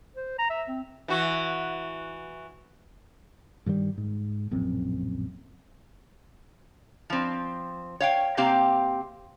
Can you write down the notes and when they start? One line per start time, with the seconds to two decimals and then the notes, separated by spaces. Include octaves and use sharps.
0.16 C5
0.38 A#5
0.50 E5
0.68 C4
1.08 E3 F#4
3.66 G2 D#3 F3 G3
3.98 G#2
4.51 D1 A#1 F#2 C4
7.10 F3 C4
8.00 C#5 F5 G5
8.37 C3 A#3 C4 G4 F5